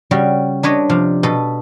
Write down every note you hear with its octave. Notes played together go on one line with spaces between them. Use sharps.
C#3 G3 F#4
D4 B4 C#5 D#5
C3 F3
B2 A4 B4